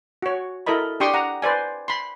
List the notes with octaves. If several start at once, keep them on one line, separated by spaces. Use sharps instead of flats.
F#4 C#5
E4 A4 A#4 D#5 B5
D4 G4 G5 C6 C#6 D#6
F#5 A#5
B4 C5 D5 G#5
B5 C6